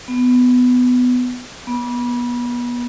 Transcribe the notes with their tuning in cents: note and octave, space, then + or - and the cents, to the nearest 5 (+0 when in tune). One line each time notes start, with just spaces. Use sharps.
B3 +15
B3 -30